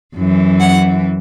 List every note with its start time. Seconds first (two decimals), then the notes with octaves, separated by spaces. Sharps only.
0.16 F#2 E3
0.59 F#5